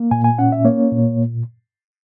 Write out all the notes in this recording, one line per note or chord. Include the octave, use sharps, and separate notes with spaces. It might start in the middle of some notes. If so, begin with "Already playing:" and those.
Already playing: A#3
A#2 G#5
G#5
C#4 F#5
E5
A#3 C#5
A#2